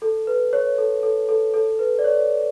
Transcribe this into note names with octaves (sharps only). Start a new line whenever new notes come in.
A4
B4
C#5
A4
A4
A4
A4
B4
D5
C#5